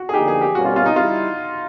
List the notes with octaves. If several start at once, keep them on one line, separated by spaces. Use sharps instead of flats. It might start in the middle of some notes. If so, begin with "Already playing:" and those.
Already playing: F#4
G#4
D3 F3 A#3 D#4 G4
G#4
G4
B2 G3 A#3 C#4 F#4
F4
F4
D#4
G3 E4 F4